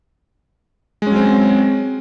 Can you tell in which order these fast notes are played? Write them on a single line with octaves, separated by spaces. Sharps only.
G#3 C#4 F#3 C4